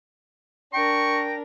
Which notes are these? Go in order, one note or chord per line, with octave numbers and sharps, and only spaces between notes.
D4 A#4 G5 C#6 A#6